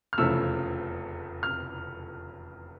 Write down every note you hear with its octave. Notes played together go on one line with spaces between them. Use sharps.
F6
F1 E2 C#3 F3 A3 E6
F6